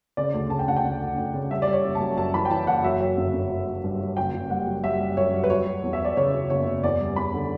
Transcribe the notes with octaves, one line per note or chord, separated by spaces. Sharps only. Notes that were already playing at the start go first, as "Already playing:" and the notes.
C#3 D5
D2
C#3 A5
G5
D2 F#5
G5
D2
D2
D2
C#3
G3 E5
D5
G3
C#5
F#1
A5
F#2
F#2 A5
E3 B5
G5
E3 A5
F#1 F#5
F#3 E5
F#3
G1
G1
F#3
F#3
G2
F#3
F#1 G5
F#1
G3 F#5
F#2
G3 E5
G3
F#2 C#5
G3
B4
F#3 C#5
F#3
E2
E5
F#3 D5
C#3 C#5
F#3
F#1 C#5
F#1
E2 D5
G3
E2 B5
D3